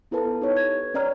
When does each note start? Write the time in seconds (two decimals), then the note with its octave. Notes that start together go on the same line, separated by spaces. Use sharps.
0.11 B3 E4 A4 B4 A5
0.41 D#4 G4 B4 C#5
0.57 G#6
0.94 C#4 C#5 D5 A#5 F6